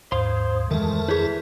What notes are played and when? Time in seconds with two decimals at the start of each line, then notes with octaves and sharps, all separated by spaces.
0.12 D#2 G#2 C5 F5 C6
0.71 F2 D#3 E3 G#3 A3 A#4 A5
1.08 E4 G#4 B4 C#5 E5